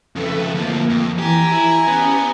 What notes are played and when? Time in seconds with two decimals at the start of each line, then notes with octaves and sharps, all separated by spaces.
0.16 F2 C#3 A4 B4 E5
0.55 D2 F3 A#3
0.90 F2
1.19 E3 G4 G#5 A#5
1.52 E4
1.87 B3 C#4 G4